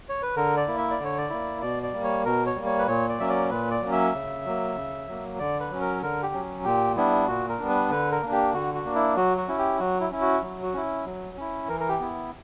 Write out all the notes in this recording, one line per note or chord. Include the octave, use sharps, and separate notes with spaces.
C#5
B4
D3 A#4
D5
A#3 E4
E5
D5
D3
C#5
D5
A#3 E4
B2 D5
D5
G3 A#3
C#5
B2 A#4
C#5
G3 A#3
C#5
B4
A#2 C#5
D5
F#3 A#3 C#4 E5
D5
A#2 B4
D5
F#3 A#3 C#4
E5
C#3
F#3 A#3
C#3
F#3 A#3
D3 D5
B4
F#3 C#4
A#4
D3 A#4
G4
F#3 C#4
A#2 G4
G3 B3 D4 E4
A#2 F#4
A#4
G3 B3 D4
B4
D3 B4
A#4
A#3 D4
G4
D3 F#4
F#4
A#3 D4
E4
F#3 F#4
F#4
C#4 E4
G4
F#3 F#4
E4
C#4 E4
F#4
F#3
F#4
C#4 E4
F#3
C#4 E4
E3 A#4
A#4
G4
B3 E4